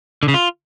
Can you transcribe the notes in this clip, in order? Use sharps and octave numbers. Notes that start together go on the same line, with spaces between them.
D3
C#3
F4